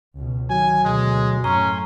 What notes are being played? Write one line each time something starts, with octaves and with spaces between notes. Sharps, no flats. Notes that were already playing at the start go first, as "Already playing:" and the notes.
C#2 B2
D#3 F#3 G#5
D2 B2 G#3
F#2 A2 C#4 G#5 A#5 C6